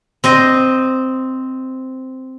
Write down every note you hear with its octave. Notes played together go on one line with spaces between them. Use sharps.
C4 C5 D#5